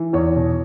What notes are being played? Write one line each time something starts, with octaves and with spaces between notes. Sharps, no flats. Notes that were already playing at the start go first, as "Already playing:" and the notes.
Already playing: E3
E2 C#5
B2